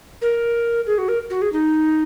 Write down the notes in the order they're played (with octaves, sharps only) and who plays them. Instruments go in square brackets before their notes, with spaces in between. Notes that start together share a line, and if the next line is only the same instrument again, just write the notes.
[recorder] A#4
G#4
F#4
A#4
F#4
G#4
D#4